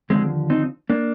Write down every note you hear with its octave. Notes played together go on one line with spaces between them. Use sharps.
D#2 D3 F3 G#3 C4
C4 D#4
A#3 D4